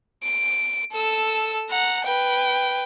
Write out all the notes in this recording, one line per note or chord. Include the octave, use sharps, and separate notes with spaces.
D7
A4 E6
F#5 A#5
B4 G5